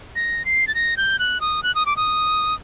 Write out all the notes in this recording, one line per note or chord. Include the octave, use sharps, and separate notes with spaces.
A#6
C7
A6
A#6
G6
F#6
D#6
F#6
D#6
D6
D#6